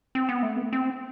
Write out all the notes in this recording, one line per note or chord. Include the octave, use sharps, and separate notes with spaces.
C4
B3
A3
B3
C4